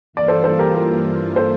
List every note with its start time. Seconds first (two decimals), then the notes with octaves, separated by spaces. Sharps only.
0.13 G2 E3 A#3 F4 D5
0.28 A4 C5
0.44 A4 C5
0.59 G4 A#4
0.74 G4 A#4
1.36 A4 C5